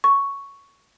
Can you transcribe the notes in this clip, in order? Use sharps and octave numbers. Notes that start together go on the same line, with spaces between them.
C#6